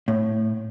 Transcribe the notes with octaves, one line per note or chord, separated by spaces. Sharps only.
A2